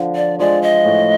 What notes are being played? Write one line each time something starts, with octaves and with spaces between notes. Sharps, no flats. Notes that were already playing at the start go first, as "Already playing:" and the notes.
Already playing: D3 F3
D5
F3 G#3 D5
D#5
A2